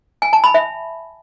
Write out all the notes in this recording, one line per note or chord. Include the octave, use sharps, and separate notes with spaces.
G#5
A5
B5
E5